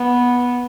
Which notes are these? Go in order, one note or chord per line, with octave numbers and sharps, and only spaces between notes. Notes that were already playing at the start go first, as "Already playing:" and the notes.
Already playing: B3